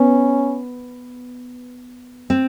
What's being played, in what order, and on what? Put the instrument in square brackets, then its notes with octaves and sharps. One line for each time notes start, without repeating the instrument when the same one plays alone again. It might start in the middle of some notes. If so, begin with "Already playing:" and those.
Already playing: [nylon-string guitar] B3 [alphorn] C#4
[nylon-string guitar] C4